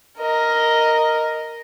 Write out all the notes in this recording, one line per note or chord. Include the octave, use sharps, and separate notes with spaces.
A#4 D#5